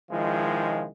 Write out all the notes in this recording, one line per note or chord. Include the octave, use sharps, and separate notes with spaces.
C#2 D#3 F3 G#3 E4